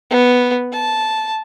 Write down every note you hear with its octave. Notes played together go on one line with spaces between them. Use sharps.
B3
A5